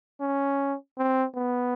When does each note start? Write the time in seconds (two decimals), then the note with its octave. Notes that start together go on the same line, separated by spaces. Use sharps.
0.21 C#4
0.98 C4
1.36 B3